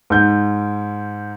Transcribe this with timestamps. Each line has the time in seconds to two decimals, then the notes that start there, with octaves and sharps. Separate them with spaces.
0.10 G#2 G6